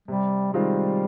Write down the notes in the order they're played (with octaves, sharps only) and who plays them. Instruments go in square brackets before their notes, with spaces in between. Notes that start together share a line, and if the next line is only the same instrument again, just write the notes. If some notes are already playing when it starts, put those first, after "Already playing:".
[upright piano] C3 [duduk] G3
[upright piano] D#3 G#3 C4 F4 [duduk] G3